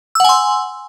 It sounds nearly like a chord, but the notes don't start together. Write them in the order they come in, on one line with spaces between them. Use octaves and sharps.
E6 F#5 G#5 C6